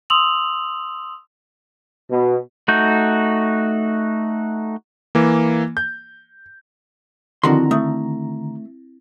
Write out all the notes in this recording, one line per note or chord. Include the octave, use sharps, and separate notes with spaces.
C6 D#6 E6 F7 F#7
B2
A3 D#4 F#4 G6
E3 A#3
G6
D3 D#3 F3 C4 E4 F#4 A#5 C6
A3 D#6